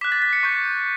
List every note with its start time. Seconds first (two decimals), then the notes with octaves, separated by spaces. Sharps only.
0.01 D6 F#6 B6
0.12 A6
0.22 B6
0.33 C#7
0.43 C#6 G6